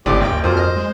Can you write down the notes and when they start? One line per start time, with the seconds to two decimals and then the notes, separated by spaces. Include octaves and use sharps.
0.06 G1 C#2 A2 C4 G4 D5
0.21 G#1 G5 D6
0.32 D#2
0.44 F2 A#2 F#3 C5
0.57 D#5 F6
0.77 G#3